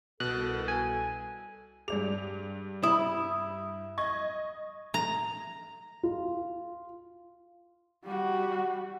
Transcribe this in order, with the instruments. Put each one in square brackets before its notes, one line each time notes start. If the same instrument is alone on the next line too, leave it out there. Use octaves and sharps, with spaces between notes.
[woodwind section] C2 A4 [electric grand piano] B2 [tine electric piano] F#6
[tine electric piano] G#5
[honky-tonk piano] G2 F7 [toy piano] G#4 D5
[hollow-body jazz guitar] E4 [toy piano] B5 D#6
[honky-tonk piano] D#5 G#6 [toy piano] C#6
[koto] A#5
[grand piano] F4
[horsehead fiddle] G3 F#4